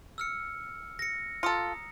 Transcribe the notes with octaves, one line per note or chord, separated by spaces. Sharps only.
E6 F6 C#7
A#6 C#7
F4 A4 A#5 D#6 C#7